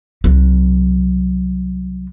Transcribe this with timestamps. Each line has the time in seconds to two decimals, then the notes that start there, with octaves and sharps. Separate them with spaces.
0.24 C2 F#3